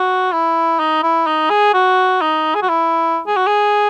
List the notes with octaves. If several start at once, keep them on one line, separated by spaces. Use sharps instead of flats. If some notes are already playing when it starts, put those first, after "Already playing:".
Already playing: F#4
E4
D#4
E4
D#4
G#4
F#4
D#4
G#4
F#4
E4
G#4
F#4
G#4